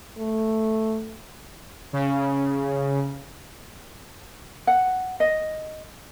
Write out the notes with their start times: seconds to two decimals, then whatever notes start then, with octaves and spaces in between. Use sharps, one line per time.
0.18 A3
1.93 C#3
4.67 F#5
5.20 D#5